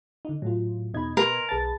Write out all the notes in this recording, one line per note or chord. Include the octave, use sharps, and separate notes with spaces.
D3 D#4
A2 F#3 F4
E2 B2 D#4 D#5 B5 G#6
A#4 B4 C6
B1 G#4 B4 A5 A6